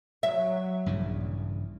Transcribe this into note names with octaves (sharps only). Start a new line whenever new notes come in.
F#3 E5
A#1 G2 C#3 E3